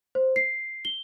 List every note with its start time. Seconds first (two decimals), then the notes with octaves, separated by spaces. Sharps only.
0.15 C5
0.36 C7
0.85 G7